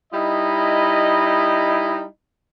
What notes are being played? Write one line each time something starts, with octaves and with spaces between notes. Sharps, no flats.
G3 D#4 E4 D#5